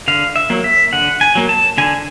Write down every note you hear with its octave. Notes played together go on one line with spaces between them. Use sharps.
D3 F5
E5
F#3 A#3
E5
D3 F#5
G#5
F#3 A#3
A5
D3 G#5